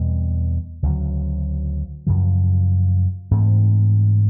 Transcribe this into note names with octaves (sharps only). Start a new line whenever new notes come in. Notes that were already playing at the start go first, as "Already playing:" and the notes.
Already playing: E2 B2 G3 C4
D2 C#3 F#3
F#2 C#3 F3
G#2 E3 A3 C4